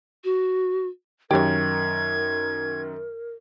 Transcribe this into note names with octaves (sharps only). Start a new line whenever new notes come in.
F#4
F#2 D#3 G4 A#4 C#5 G#6